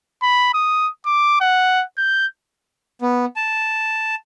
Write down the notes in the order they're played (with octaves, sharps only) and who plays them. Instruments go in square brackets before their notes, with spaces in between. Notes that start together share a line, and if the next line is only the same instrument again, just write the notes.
[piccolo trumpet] B5
D#6
D6
F#5
G6
[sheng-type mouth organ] B3
A5